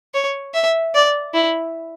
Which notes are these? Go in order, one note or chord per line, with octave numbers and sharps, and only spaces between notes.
C#5
E5
D5
E4